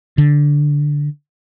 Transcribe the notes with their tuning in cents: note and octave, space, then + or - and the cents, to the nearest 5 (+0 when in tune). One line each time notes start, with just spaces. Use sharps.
D3 -5